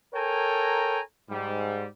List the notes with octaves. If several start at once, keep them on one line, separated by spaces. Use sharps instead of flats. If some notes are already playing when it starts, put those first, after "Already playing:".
A4 A#4 C#5 G5 G#5 A#5
G#2 G3